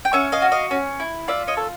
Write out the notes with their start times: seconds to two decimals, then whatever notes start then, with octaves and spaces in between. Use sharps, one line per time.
0.05 G5
0.13 C#4 E5 F#5
0.32 D#5 F5
0.42 F#4
0.52 D#5 F5
0.71 C#4
1.00 E4
1.28 F4 D5 E5
1.48 C#5 D#5
1.57 A4